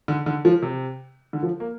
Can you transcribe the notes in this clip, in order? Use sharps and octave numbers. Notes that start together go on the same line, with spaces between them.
D3
D3
F3
C3
D3
F3
A#3